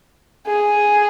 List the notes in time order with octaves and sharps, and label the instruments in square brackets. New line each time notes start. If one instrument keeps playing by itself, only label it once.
[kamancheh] G#4